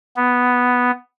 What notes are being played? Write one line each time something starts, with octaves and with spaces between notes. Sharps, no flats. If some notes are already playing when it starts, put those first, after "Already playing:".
B3